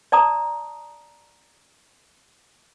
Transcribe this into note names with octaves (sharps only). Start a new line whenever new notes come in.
D5 A5 A#5 D#6